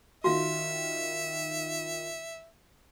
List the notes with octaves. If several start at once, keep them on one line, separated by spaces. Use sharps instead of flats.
D#3 F4 F#4 E5 F5